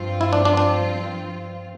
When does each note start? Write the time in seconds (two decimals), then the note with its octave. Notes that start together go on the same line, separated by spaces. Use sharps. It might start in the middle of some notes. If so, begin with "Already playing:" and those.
Already playing: G2 F3 C4 F4
0.21 E4
0.33 D4
0.45 D4
0.57 D4